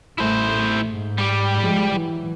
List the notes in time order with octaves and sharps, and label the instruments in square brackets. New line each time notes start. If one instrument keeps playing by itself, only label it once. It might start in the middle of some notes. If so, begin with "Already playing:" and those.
[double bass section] A1 A3 [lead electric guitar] E4 C5
[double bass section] G#2
[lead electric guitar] G3 G4
[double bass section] F3 G#3
E3 F#3